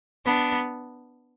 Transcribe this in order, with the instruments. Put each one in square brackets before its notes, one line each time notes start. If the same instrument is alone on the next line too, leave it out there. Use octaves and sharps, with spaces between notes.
[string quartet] B3 D4